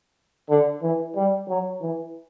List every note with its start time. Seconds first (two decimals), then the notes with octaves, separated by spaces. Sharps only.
0.49 D3
0.82 E3
1.15 G3
1.48 F#3
1.81 E3